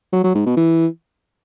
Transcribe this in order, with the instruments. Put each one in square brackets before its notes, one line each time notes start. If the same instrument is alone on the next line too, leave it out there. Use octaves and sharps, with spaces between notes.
[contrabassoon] F#3
F#3
G#2
B2
E3